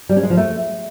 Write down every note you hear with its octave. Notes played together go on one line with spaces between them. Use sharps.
G3
C#4
G#3
F3
A3